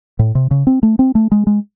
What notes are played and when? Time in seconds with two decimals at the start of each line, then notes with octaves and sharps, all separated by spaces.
0.19 A2
0.35 C3
0.51 C#3
0.67 C4
0.83 A3
0.99 C4
1.15 A3
1.32 G#3
1.47 G#3